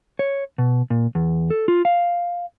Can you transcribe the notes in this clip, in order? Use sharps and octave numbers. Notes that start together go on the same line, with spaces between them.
C#5
B2
A#2
E2
A4
F4
F5